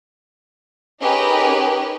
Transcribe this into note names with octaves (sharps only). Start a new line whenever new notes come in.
C#4 D#4 G4 G#4 A#4 B4